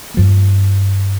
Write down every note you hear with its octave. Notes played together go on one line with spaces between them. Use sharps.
G2 F3 A#3